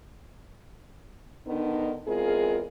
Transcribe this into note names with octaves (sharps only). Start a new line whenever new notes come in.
D3 D#3 B3 D4 D#4
E2 G#3 C4 F4 G#4 A#4